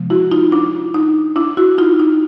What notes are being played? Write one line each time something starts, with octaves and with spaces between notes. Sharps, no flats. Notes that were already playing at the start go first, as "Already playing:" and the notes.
Already playing: C3 F3 G#3 B3
E4 F#4
D#4 F4
D4 E4
D#4
D4 E4
E4 F#4
D#4 F4
D#4